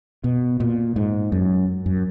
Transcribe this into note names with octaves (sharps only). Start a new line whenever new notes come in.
B2
A#2
G#2
F#2
F#2